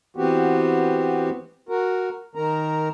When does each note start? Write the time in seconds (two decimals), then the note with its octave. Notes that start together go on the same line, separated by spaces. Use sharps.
0.17 E3 B3 C4 F#4 G4
1.69 F#4 A#4
2.35 D#3 A#4 A#5